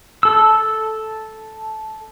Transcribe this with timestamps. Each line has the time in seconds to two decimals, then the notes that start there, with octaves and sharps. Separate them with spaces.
0.23 A4 E6